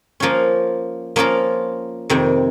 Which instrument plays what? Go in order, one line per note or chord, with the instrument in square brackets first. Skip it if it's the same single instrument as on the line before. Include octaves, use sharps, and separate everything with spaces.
[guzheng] F3 A#3 C#4 F4 A#4
F3 A#3 C#4 F4 A#4
F2 C3 D#3